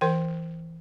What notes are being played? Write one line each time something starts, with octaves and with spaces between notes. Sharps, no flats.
E3 A#4 G5